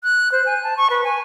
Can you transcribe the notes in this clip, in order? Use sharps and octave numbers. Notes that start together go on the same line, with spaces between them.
F#6
C5
G#5
A5
C#6
B4
G#5